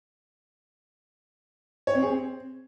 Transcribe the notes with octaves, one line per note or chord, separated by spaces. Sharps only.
C#5
C4
G#4
C4